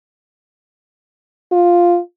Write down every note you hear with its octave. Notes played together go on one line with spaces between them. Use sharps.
F4